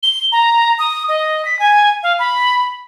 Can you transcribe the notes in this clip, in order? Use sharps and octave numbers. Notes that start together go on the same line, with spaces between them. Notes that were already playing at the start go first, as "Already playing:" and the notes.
G7
A#5
D#6
D#5
B6
G#5
F5
B5